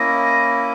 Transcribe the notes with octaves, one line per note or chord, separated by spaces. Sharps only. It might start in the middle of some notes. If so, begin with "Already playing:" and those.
Already playing: A#3 C#4 E4 D#5